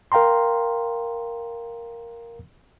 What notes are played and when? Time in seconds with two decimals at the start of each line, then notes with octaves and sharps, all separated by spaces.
0.12 A#4 F5 G5 A#5 C6